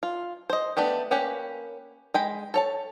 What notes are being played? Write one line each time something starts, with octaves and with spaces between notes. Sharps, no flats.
F4
C5 D#5
A3 B3 D4 G4
A#3 C#4 G4 B4
G#3 G5 B5
A4 C#5 A5